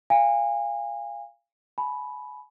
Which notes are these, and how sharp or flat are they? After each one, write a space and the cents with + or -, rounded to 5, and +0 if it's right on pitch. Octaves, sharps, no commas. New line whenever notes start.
F5 -10 G#5 -30
G#5 +35 B5 +0